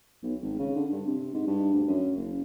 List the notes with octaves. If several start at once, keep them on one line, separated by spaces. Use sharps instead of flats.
B1
G#1
C#3
D3
G2
C3
G#2
G2
D2
F#2
F#1